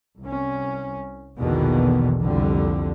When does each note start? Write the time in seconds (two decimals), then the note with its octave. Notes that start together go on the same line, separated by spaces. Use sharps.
0.20 C2 C#4
1.37 A#1 E2 B2 D3 D#3
2.20 C2 F2 D3 G3